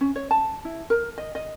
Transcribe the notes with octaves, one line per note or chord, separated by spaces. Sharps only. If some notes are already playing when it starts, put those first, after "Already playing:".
C#4
C#5
A5
E4
A#4
D#5
D#5